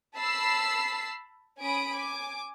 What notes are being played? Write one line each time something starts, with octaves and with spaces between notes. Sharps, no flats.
A5 B5 E6 C7
C#4 G#5 B5 D#6 D7
G#5 D6